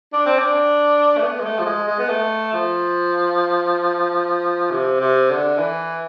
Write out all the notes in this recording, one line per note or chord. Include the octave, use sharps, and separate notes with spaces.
D4
C4
D4
A3
B3
G#3
A3
F3
G#3
G#3
B3
A3
F3
C3
C3
D3
E3